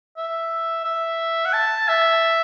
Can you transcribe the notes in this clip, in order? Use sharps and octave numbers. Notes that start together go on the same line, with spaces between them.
E5
E5
F#5
A5
E5